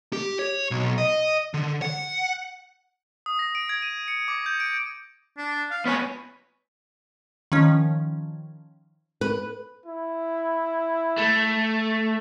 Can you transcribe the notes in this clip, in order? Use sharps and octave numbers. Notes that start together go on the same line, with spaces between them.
G4
C#5
B1
D#5
D3
F#5
D#6
A#6
D7
G#6
D#7
C#7
D6
G6
D7
D4
F5
B3 B4 C#5 G#5
D#3 F3 C#4
B4
E4
A3